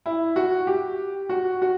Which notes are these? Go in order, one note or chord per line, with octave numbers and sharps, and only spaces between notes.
E4
F#4
G4
F#4
F#4